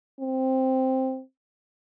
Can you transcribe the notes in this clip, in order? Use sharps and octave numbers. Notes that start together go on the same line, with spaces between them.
C4